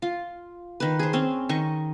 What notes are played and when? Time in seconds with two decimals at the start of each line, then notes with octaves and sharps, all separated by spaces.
0.02 F4
0.80 D#3 B4
0.99 G#4 C5
1.13 C4 C#4
1.49 D#3 D#5 C#6